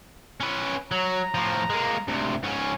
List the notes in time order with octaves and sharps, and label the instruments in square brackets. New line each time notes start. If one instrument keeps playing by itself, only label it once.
[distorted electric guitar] C#4 B4
[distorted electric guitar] F#3 [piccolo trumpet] A#5
[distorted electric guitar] A2 F3
G#3 A#3
D2 C3
G#2 C#4